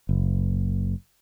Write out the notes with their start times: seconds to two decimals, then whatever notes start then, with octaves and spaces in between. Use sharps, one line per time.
0.09 F#1